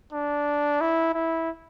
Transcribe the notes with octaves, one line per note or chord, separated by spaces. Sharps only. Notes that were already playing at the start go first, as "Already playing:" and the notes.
D4
E4
E4